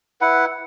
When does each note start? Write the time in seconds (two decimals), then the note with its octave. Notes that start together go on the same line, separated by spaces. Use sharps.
0.21 E4 B4 F#5